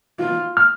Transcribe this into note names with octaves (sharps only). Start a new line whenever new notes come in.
F4
F6